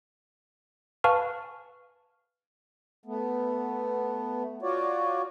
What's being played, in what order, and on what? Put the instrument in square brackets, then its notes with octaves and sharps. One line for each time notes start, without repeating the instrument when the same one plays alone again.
[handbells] B4 F5 G#5 A5 C#6 F6
[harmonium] A3 B3
F4 F#4 C#5 D5